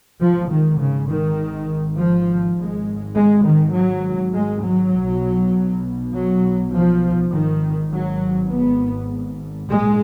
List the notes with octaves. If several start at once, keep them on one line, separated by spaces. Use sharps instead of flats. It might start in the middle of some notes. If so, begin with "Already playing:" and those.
G#1 G#2 F3
D#3
C#3
D#3
F3
G#1 G#2 G#3
G#3
D#3
F#3
G#3
F#3
B1 B2
F#3
F3
G#1 G#2 D#3
F#3
B3
A#1 G#2 G#3